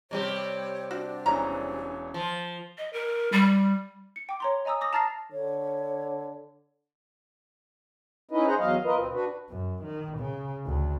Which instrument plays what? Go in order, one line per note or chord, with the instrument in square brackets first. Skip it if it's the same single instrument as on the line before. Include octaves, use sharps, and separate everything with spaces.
[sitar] C3 G3 G4 [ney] C#5
[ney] D4 [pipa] F#4
[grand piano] E1 E3 C#4 [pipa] A#5
[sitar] F3
[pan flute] D#5
A#4
G3
[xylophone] C#7
G5 D6
C#5 A#5 C6
D#5 G#5 A#5 D#6 E6
D6 D#6 A#6
A5 A#5 F6 A6 A#6 C7
[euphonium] D3 [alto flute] C#5
[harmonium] C#4 D#4 E4 B4 D#5
G#4 C5 F#5 A#5
E2 F#3 D#5 F5
F4 A#4 B4 D#5
D2 B2 C4
D4 F#4 B4
[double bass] F#2
D#3
C#3
D2